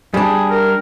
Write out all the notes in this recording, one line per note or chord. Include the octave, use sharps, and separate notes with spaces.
G3 D4 G#4
A#4